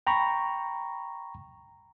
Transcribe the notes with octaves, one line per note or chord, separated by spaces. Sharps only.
G5 A#5 B5 C#6